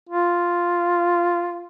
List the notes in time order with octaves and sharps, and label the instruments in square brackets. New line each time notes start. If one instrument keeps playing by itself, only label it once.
[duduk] F4